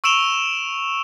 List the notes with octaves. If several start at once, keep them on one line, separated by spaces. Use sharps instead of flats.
C#6 E6 D7 E7 F7 G7